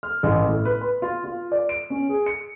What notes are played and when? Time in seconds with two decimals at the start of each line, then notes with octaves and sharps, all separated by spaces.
0.03 F6
0.23 A1
0.48 A2
0.65 B4
0.81 B5
1.02 F4
1.24 F4
1.52 D5
1.69 D7
1.90 C#4
2.09 G#4
2.26 C#7